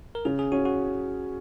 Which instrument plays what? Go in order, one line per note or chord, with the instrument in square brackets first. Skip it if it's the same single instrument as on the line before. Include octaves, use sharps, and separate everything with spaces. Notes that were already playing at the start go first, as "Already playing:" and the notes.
[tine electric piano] A#4
[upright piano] C#3 [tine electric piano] G#4
[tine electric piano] G#4
[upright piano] C#4 [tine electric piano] F#4
[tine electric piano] F#4